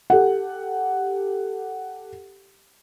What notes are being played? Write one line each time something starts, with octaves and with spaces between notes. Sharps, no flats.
G4 A4 F#5